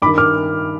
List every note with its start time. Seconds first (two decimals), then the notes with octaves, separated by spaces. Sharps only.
0.02 G2 B5 D6
0.07 D#3
0.18 D6 F6